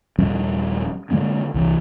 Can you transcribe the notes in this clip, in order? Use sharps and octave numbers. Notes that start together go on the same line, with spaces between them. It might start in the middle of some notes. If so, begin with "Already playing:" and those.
D#1 F3 G3 C#4
D3 G#3 A#3 C#4
C2 E3